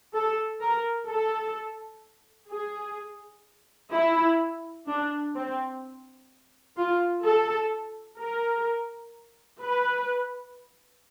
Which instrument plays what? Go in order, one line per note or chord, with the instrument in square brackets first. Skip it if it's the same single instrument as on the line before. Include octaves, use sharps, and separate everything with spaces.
[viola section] A4
A#4
A4
G#4
E4
D4
C4
F4
A4
A#4
B4